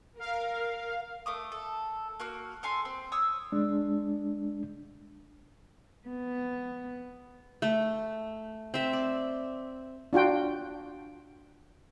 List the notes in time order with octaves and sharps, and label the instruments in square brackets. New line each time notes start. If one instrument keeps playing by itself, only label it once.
[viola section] A#4 [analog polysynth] F5
[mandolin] A3 D6 D#6
A4
A#3 F#4 F6
A4 F5 G#5 C6
C4
C#5 D#6 E6
[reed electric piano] G#3 D4
[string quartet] B3
[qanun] A3
C4 E5
D5
[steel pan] D4 F4 F#4 G5